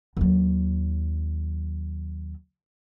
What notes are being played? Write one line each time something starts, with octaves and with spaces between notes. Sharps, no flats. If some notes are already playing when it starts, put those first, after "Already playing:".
D#2 F#3